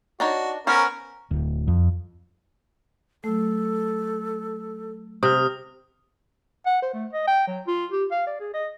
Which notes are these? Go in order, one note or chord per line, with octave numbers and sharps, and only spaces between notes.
D4 D#4 F#4 C#5
B3 C#4 A#4 C5
D1
F2
F#3 A3 A4
C3 D#6 F6
F#5
C5
A3
D#5
G5
F#3
F4
G4
F5
D5
G#4
D#5